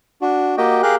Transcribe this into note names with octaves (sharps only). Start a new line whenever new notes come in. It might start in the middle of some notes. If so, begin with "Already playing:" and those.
D4 F#4
A#3 F#4 G4 D#5 G5
G4 G#4 A#4 F5 G5 F#6